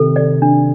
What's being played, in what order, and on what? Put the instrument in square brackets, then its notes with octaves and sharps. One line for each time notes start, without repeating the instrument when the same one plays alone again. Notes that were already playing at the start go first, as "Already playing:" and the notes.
Already playing: [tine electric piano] C3 D#3 [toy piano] A4
[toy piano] D5
D4